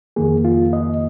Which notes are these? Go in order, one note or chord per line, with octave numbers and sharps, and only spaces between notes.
F2 D#3 A#3 G#4
F4
D#5